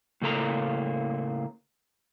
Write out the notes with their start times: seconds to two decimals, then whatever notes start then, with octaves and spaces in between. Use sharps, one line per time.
0.22 A2 C#3 A#3 A4 A#5